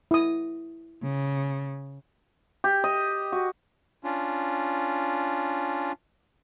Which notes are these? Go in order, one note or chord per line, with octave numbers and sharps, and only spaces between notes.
E4 D#6
C#3
G4
D#5
F#4
C#4 D4 F4